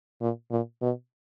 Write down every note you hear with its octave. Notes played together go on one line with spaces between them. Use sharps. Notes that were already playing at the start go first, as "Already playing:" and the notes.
A#2
A#2
B2